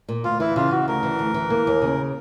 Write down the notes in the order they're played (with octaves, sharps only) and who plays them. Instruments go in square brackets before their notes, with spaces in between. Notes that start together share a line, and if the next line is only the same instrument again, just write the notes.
[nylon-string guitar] A#2
[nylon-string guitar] D2 [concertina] F4
[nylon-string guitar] E3 [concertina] E4
[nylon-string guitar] C#3 [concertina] F4
[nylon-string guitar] C#3 [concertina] F#4
[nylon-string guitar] D2 [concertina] A#4
[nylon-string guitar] E3
D2
E3
A#3
D#2
C#3